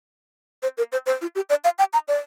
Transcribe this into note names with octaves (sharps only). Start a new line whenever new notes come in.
C5
A#4
C5
C5
F4
G4
D5
F5
G5
A#5
D5